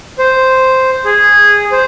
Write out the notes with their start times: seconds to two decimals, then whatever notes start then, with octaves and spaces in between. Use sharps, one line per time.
0.19 C5
1.05 G#4
1.72 C5